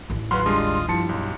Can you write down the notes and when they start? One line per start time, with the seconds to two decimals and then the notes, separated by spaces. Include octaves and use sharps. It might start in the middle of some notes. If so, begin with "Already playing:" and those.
0.10 A1 D#2
0.31 F#3 F#4 B4 F5 C6
0.46 G3 G#3 D4 F4 D#5
0.88 G2 F3 E4 A5 C#7
1.09 B1